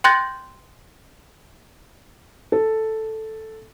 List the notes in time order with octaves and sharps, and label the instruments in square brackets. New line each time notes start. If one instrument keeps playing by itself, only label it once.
[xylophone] G5 C6 F#6 G6 A6 A#6
[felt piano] A4